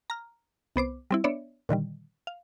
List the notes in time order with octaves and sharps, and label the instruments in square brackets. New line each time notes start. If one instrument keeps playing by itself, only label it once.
[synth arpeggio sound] A#5 F6
C2 B3 C5 D6
G3 C4 E4
B3 D4 C#5 D5 E5
A#2 D3 D#3 G3
F5